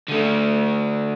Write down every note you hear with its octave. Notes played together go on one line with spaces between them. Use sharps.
D3 A3